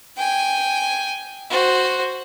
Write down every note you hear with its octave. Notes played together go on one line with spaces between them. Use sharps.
G5 G#5
F#4 C5